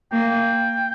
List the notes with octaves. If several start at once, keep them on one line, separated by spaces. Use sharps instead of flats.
A#3 G5